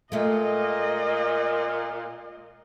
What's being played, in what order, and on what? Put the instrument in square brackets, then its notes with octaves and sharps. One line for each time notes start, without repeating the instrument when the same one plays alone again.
[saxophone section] A#2 [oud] G#3 A3 [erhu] D#5